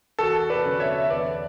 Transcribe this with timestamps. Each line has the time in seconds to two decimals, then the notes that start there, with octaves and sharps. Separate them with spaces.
0.19 E2 F#4 A4
0.49 B4 D5
0.64 D3 F#3 C#4
0.80 C#5 E5
1.01 E5
1.10 E2 B4 D5